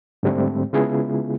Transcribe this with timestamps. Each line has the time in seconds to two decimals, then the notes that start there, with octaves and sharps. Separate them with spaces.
0.23 G#2 D3 G3 A3 C4
0.73 C#3 G#3 B3 E4 F4 G#4